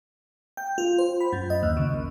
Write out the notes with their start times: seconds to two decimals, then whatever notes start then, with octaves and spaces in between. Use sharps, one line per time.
0.57 G5
0.78 F4
0.98 C5
1.21 B5
1.33 F#2
1.50 D#5
1.63 D#2
1.77 C#3
1.94 A#1